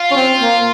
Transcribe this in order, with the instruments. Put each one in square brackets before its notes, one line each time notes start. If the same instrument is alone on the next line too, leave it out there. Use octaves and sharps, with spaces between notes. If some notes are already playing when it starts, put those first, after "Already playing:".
Already playing: [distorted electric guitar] F4
[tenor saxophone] C#4
C4
A#3